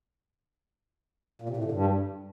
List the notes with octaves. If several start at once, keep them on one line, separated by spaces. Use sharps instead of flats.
A#2
C3
A2
D3
G2